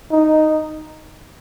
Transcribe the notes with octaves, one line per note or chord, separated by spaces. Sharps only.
D#4